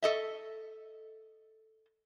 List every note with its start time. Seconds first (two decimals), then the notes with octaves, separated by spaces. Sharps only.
0.02 A4 D#5 E5